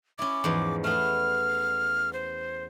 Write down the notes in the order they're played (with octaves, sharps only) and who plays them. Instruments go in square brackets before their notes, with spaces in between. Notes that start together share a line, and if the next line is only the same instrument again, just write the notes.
[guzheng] C#4 E4 [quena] D6
[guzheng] E2 G#2 F3
[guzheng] A3 B3 [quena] F6
[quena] C5